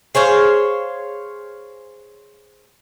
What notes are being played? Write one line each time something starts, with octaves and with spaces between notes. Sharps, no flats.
G#4 C5 C#5 F5